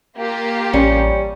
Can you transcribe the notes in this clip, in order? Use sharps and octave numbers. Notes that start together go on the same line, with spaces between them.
A#3 F4 G4
A1 G3 C#4